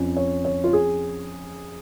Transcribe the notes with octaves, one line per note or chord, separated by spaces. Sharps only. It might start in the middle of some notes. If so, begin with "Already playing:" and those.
Already playing: F2 F3 C#4
C#5
C#5
F4
G#4